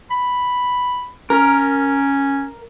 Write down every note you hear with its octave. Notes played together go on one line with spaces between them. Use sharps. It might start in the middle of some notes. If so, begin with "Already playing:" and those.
B5
C#4 A#4